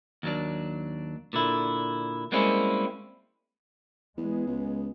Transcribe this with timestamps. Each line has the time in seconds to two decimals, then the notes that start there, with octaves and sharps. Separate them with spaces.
0.23 D#2 F#3 D4
1.33 A#2 D3 E4
2.32 G3 G#3 A#3 C4 C#4 E4
4.17 E2 G#3 B3
4.47 C#2